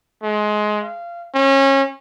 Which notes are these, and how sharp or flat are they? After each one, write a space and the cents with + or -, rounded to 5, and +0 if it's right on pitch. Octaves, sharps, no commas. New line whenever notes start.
G#3 +20
F5 -20
C#4 -30